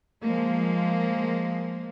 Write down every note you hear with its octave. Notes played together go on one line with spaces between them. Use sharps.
F3 G#3 A#3